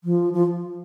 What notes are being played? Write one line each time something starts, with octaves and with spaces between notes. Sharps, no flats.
F3
F3